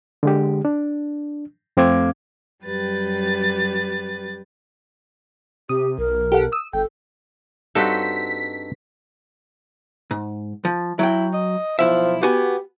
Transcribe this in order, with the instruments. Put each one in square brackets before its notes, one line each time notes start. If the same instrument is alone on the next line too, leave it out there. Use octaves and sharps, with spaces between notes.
[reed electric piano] D3 G#3 G4
D4
F2 A3 C4 F5 D6 G#6
[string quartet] F#2 G3 G4 B4 A6
[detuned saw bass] C3 [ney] G4 [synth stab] D#6
[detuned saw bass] B1 [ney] A#4
[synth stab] G4 A4 F#5
D#6 E6
[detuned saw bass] G1 [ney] A4 [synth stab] G5
[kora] G2 C4 F#4 [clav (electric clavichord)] D#4 A4 [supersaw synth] B6
[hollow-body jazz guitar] G#2
F3
[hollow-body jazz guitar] F#3 G5 [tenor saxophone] E4
[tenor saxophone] D#5
[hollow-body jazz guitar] B1 E4 E5 [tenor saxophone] F3
[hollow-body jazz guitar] B3 F#4 G#5 [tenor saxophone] G4